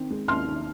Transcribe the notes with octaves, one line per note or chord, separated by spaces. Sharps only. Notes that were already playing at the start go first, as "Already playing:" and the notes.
Already playing: D#3 C4
G#3
D#2 C6 F6
D#3